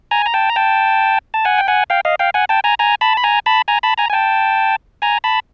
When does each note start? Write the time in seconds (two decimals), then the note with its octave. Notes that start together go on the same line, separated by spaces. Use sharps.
0.11 G#5 A#5
0.26 A#5
0.34 G5 A5
0.50 A#5
0.56 G5 A5
1.34 A5
1.45 F#5 G#5
1.58 G5
1.68 F#5 G#5
1.90 F5 G5
2.05 D#5 F5
2.19 F5 G5
2.34 F#5 G#5
2.49 G5 A5
2.64 G#5 A#5
2.79 G#5 A#5
3.01 A5 B5
3.17 B5
3.23 G#5 A#5
3.46 A5 B5
3.68 G#5 A#5
3.83 A5 B5
3.98 G#5 A#5
4.10 G#5
4.13 G5 A5
5.02 G#5 A#5
5.24 A5 B5